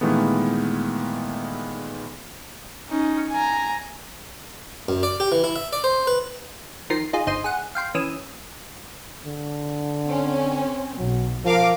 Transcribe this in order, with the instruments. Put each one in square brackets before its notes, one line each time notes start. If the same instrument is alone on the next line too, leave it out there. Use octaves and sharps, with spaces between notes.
[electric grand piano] A#2 D#3 E3 G#3 A3 B3
[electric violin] C#4 D#4
G#5 A#5
[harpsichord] F#2
D5
G4
E3
E4
E5
D5
C5
B4
[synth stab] D#3 F3 C6 A#6 C7
D#4 F4 G#4
G1 D#4 C5 D#6 C7
G#4 F#5
F5 G5 C6
E3 C#4 D#6 E6
[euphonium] D3
[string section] C4 C#4
[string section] B1 [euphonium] F#3
[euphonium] F3 [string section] A#4 F5 D6